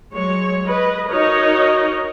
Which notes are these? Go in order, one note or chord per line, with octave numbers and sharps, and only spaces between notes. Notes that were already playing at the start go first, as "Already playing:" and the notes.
F#3 G#3 C#5
B4 D#5
D#4 F#4 A#4 C#5 D#5